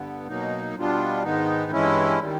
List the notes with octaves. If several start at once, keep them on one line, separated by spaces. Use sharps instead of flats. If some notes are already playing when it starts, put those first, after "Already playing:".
Already playing: G2 D3 B3
B2 F#3 A#3 D#4
B2 G3 B3 D4 F4
G#2 D#3 G#3 B3 D#4
G2 E3 G#3 C#4 E4
D#3 G3